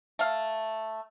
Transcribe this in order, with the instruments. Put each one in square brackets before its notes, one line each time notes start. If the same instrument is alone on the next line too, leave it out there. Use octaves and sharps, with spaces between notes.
[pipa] A3 F5